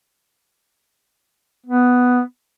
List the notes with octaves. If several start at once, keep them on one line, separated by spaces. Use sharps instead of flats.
B3